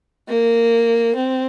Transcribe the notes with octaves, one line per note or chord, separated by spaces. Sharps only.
A#3
C4